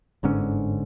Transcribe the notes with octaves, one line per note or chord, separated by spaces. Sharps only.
G1 G#2 D3 C#4